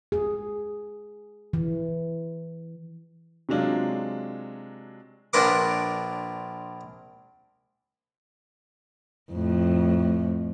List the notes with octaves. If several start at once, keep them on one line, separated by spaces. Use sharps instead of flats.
G#4
E3
C3 F#3 G#3 D4 F4
A#1 D4 F4 A#4 B4 D6
F2 A2